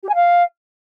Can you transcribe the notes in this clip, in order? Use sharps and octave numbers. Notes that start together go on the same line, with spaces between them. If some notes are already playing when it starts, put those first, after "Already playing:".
G4
G#5
F5